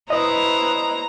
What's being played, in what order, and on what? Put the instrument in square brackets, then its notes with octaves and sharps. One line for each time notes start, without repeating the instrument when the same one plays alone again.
[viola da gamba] E4 B4 C5 [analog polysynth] D#5 [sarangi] A#5